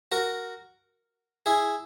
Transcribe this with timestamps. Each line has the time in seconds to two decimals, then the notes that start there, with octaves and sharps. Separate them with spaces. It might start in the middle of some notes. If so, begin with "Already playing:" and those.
0.12 F#4 A#4
1.46 E4 G#4